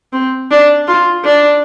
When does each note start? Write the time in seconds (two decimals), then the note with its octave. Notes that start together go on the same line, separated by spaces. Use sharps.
0.13 C4
0.51 D4
0.88 F4
1.24 D4